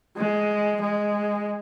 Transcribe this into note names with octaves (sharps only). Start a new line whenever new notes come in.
G#3
G#3